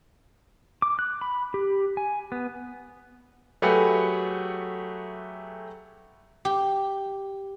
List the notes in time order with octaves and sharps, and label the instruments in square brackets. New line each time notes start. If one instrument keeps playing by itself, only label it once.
[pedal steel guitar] D6
F#6
B5
G4
G#5
B3
[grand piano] F#3 A3 G4 G#4 B4 F#5
[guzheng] G4